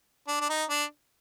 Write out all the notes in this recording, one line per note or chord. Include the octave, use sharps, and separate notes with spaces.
D4
D4
D#4
D4